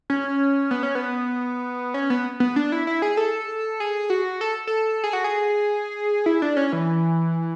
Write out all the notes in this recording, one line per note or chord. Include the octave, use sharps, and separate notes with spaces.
C#4
B3
C#4
B3
C#4
B3
B3
D4
E4
E4
G#4
A4
G#4
F#4
A4
A4
G#4
F#4
G#4
E4
D4
C#4
E3